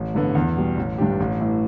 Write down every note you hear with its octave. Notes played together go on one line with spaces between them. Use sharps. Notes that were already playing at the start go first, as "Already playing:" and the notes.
Already playing: A1
G2 D3 B3
E2
B2 G3
A1
G2 G3 D4 G4
A1
A2 E3